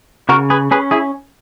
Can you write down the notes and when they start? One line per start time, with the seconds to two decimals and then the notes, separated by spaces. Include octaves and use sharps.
0.29 C#3 F#4 A#4
0.50 G#4 B4
0.71 C#4 G#4 B4
0.91 E4 G#4